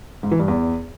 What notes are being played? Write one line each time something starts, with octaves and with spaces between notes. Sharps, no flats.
G#2
E3
G2
E2